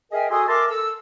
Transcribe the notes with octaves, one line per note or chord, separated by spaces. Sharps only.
G#4 A#4 D#5 E5 G5 G#5
F#4 A4 G#5 C6 D#6
A#4 E5 A5 C6 D6
A4 E6